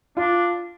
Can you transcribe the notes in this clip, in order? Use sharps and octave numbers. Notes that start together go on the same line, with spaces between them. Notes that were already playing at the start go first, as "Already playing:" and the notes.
D4 F4